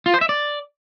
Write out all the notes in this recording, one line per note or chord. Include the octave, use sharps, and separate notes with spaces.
F4
C5
E5
D5